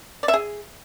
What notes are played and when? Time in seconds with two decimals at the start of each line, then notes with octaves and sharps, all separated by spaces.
0.23 D5
0.28 E5
0.34 G#4